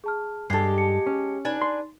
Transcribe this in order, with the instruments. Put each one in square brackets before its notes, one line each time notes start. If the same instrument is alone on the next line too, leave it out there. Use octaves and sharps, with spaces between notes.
[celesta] G#4 A5 F6
[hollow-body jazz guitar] G2 A4 [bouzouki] G#3 G4 [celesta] C7
[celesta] A5 C#7
[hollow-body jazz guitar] C#4
[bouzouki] D4 B4 G#5 [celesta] D#4
[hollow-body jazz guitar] C6